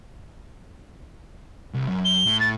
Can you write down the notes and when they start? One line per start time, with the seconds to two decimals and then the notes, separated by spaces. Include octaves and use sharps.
1.74 C2
1.88 F#2
2.05 G7
2.26 A2
2.40 A6